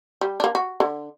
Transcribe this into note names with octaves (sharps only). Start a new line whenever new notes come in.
G3
A#3 D4
F#4
D3